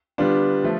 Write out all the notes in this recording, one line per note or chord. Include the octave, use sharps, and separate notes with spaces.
D3 G3 B3 D4 F4
F3 A3